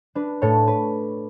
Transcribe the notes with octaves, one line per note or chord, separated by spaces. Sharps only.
D4 B4
A2 A4 C#5
B4